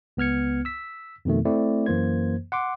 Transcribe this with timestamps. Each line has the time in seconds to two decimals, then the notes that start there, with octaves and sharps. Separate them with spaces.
0.17 C#2 B3 F6 G#6 C#7
0.65 E6 B6
1.25 F2 B2 D#3 A3
1.45 A3 C4 E4 D5
1.86 F#2 E3 A#3 C5 G#6
2.52 F#5 C6 D6